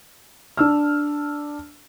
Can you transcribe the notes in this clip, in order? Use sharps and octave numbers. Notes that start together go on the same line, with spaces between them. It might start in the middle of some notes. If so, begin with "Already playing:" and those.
D4 E6 F6